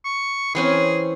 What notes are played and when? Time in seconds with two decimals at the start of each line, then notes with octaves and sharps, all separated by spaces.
0.05 C#6
0.55 E3 C4 C#4 G#4